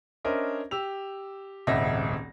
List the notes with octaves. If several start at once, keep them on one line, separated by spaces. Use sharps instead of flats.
C#4 D4 A#4 C5 D#5 E5
G4 E6 F7
D#1 G#1 C#2 D#5 E5 A#6